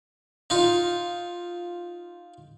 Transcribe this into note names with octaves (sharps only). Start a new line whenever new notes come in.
D#4 F4